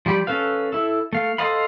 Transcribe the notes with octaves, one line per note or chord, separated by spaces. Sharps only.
F3 G3 G4 D5 B5
C#4 A4 B4 F5
E4 A4
A3 F5
A4 C5 D#5 F5 B5